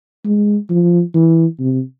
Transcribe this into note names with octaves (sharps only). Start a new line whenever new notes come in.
G#3
F3
E3
C3